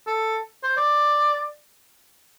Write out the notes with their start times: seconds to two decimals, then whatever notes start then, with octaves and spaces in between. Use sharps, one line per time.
0.07 A4
0.63 C5
0.77 D5